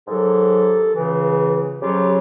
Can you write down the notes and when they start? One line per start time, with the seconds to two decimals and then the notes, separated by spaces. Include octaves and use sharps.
0.08 G#2 D#3 F#3 G4 A4
0.95 C#2 C#3 E3
1.81 F2 C#3 F#3 F4 G4